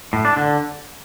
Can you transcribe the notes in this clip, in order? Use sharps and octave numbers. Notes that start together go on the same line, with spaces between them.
A2
D4
D3